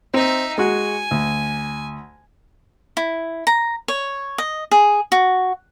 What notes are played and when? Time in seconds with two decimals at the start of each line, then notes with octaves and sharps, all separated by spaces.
0.14 C4 D#4 E5
0.58 G#3 F#4 G#5
1.11 D2
2.97 E4
3.47 A#5
3.88 C#5
4.38 D#5
4.71 G#4
5.12 F#4